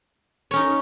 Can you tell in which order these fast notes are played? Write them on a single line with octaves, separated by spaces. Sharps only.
C#5 C#4 D#4